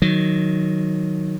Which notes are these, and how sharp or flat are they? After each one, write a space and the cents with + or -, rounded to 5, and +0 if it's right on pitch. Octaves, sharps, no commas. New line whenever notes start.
D#3 +0 F#3 +0